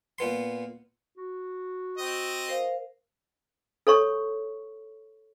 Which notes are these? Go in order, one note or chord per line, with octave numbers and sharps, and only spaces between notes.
A#2 B3 C6
F#4
C4 D#5
A#4 C5 F5
A4 C#5 C#6